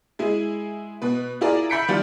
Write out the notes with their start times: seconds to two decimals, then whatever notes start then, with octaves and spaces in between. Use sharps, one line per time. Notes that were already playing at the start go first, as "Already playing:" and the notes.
0.19 G#3 E4 G#4
1.02 B2 B4
1.41 E4 F4 G#4 A#4 D5
1.70 E5 B5 G6 B6 C#7 D7
1.88 D#3 F3 G3 F4 G4